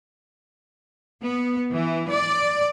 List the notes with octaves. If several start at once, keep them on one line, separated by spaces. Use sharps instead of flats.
B3
E3
D5